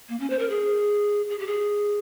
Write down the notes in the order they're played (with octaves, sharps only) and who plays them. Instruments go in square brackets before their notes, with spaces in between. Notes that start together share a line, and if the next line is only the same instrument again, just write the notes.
[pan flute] A#3
C#4
C5
A#4
G#4
G#4
G4
G#4